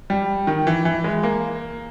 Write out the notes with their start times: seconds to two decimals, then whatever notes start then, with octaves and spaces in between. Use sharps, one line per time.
0.10 G3
0.47 D#3
0.67 E3
0.85 E3
1.04 G#3
1.23 A#3